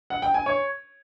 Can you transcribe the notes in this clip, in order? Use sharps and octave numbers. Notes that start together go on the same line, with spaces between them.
F#5
G5
G#5
C#5